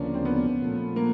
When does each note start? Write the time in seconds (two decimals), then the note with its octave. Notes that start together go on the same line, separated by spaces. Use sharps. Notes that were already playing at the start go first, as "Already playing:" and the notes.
Already playing: D2 C#3 F3 A#3 C#4 D4
0.14 C4
0.25 B3
0.61 A#2 F3 A3
0.96 A#3